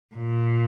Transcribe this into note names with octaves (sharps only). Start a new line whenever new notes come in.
A#2